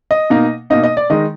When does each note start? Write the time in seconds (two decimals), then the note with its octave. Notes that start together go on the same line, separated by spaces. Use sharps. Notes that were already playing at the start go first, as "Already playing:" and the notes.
0.11 D#5
0.30 B2 A#3 D#4
0.70 B2 A#3 D#4 D#5
0.83 D#5
0.97 D5
1.10 D#3 G#3 D#4 D#5